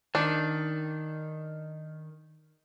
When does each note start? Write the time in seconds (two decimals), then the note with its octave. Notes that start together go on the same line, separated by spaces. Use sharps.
0.15 D#3 D4